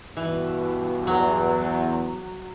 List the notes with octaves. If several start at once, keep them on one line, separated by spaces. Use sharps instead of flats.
G2 B2 E3
E2 F#3